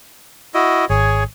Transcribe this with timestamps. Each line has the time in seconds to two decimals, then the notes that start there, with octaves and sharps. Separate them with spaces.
0.54 E4 F#4 D#5
0.90 G#1 G#4 C#5